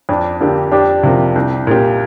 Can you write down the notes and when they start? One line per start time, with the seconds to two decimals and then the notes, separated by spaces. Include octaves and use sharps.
0.09 F2 D4
0.41 D3 A#3 D4 G4
0.72 F2 D4 G4
1.03 C3 F3 A#3
1.35 C2
1.67 A#2 A#3 G4